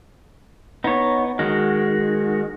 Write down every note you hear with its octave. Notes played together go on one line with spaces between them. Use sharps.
B3 D#4 C#5
D#3 G#3 F#4